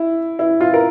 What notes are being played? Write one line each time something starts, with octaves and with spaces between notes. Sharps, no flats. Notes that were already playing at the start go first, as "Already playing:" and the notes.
Already playing: E4
E4
F4
A#4